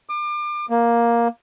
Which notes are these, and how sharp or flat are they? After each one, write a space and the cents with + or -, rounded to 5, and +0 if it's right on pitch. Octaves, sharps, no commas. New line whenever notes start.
D6 +35
A#3 +10